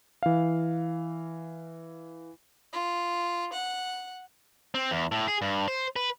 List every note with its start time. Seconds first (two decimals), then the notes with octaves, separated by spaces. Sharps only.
0.23 E3 F5
2.73 F4
3.53 F#5
4.74 C4
4.91 E2
5.12 A2
5.28 G#4
5.42 G2
5.68 C5
5.96 B4